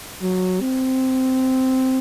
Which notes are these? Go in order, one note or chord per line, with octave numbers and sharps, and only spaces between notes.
F#3
C4